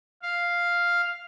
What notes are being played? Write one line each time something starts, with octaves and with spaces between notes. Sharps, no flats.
F5